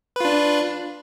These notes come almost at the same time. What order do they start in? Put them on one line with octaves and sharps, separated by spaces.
B4 F4 D4